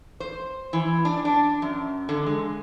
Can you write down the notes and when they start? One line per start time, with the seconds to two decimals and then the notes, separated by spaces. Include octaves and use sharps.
0.20 C5
0.73 E3
1.05 D4
1.25 D4
1.62 F#2
2.09 D3
2.26 G#3